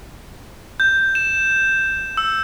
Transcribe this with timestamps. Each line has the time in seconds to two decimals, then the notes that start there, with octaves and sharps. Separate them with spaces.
0.80 G6
1.15 E7
2.17 E6